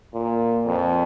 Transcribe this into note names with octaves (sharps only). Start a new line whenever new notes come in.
A#2
F2